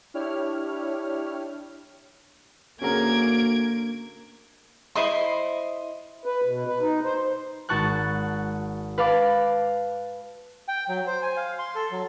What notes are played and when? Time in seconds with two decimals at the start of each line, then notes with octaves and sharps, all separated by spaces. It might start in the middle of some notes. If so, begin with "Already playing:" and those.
0.14 D4 E4 G4 C#5 F6
2.82 D2 A#3 C#4 G#4 A#4 G#6 D7
4.95 E4 C5 D#5 C6
6.25 B4
6.45 B2
6.67 B4
6.81 D#4
7.04 C5
7.69 G#1 F#4 A5 C#6 F#6
8.98 B4 F5 A5 D6
10.68 G5
10.88 F#3
11.07 C5
11.23 G#5
11.37 F5
11.59 C6
11.75 A4
11.92 F#3